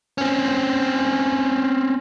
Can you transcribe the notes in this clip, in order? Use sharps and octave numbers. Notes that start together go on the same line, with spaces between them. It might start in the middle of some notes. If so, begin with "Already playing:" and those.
C4 C#4